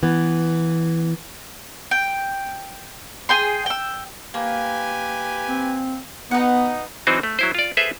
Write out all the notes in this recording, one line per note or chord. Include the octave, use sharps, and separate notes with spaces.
E3 B3
G5
G#4 G5 C6
G5 E6
A#3 G4 B4 G#5
C4
B3 D#4 B4 F#5
E3 F#3 C4 D#4 F#4 C5
A3
F#3 E4 C5
F4 D5
G#4 A4 B4 C5 E5